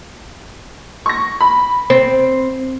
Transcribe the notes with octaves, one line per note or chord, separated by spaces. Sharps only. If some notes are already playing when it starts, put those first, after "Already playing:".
C#6 A#6
B5
C4